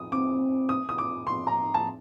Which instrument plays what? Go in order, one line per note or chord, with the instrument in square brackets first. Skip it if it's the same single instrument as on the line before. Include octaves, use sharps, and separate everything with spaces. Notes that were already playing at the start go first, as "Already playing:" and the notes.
Already playing: [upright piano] D#6
[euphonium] C4 [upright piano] D6
[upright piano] D#6
D#6
D6
C6
A#5
A5